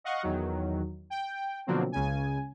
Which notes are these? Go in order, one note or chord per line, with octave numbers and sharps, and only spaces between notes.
D#5 F5 F#5 C#6
E2 D#3 F#3
G5
B2 D3 F3 F#3 A#3 C4
C#2 C#3 G#5